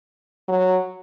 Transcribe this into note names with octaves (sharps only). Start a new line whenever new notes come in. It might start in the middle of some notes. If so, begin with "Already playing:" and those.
F#3